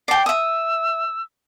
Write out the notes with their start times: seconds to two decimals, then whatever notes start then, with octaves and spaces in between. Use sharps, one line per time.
0.08 D5 G5 C7
0.26 E5 D#6 E6